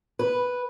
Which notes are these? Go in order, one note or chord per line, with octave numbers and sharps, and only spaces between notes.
B4